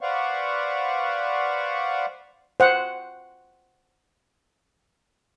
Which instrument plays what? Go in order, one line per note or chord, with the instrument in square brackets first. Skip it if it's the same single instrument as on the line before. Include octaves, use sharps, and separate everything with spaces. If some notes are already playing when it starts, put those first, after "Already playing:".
[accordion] B4 C5 D5 F5 F#5 C#6
[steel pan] C5 F#5